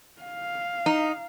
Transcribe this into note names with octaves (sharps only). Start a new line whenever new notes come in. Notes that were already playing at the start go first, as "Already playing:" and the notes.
F5
D#4